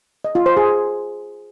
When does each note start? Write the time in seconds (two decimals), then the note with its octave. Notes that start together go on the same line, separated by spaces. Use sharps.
0.24 D#5
0.35 F4
0.46 C5
0.57 G#4